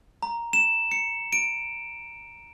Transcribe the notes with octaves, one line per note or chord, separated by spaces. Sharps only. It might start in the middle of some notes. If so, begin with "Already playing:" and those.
A#5
E7
C#7
D7